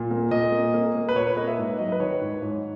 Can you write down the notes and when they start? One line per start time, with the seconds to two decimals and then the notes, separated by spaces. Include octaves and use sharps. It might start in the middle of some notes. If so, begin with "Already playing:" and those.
Already playing: A#2
0.11 A#3
0.31 A#2 D#5
0.52 A#3
0.74 A#3
0.95 A#3
1.09 B4
1.15 A#2 C#5
1.27 B4
1.37 A#3 D#5
1.48 E5
1.58 G#2
1.79 F#3 D#5
1.92 B4
2.00 D#3 C#5
2.21 G#2
2.42 G#2 C#5